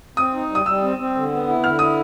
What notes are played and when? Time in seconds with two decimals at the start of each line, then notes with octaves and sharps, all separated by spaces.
0.17 C4 D#6
0.33 D#4
0.50 G3
0.55 D#6
0.66 G3 E6
0.82 C4
0.98 C4
1.15 D3
1.32 B3
1.48 E4
1.64 D3 F6
1.79 E4 D#6